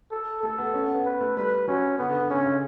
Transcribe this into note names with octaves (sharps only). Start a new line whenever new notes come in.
A4
A3 A4
B3
C#4
B3
B3
B3 B4
A3
G3 B4
F#3 C#4
D3 B3
D3
D3
C#3 C#4
C#3